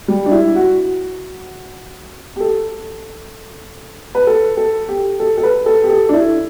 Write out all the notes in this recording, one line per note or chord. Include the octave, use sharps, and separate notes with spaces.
G3
D4
E4
F#4
G4
A4
B4
A4
A4
G4
A4
A4
B4
A4
G4
A4
D4
E4